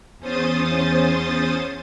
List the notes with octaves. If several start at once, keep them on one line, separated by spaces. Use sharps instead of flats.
E2 C#4 C5 D#6 A6